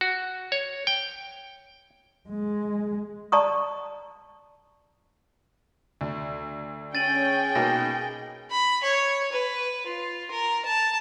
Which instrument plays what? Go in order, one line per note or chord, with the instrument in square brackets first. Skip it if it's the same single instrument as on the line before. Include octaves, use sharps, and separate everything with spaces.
[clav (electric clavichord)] F#4
C#5
G5
[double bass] G#3
[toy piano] D5 A5 A#5 C#6 D#6
[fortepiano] D2
[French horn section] C#4 [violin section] G#4 G5 [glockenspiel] A6 D#7 F#7
[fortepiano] B2 A#3 D#4 [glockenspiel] A#6
[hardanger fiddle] B5
C#5
B4
F4
A#4
A5